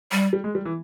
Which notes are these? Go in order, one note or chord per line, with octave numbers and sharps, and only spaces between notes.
G3
G3
G#3
G3
E3